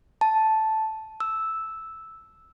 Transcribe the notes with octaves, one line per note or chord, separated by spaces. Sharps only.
A5
E6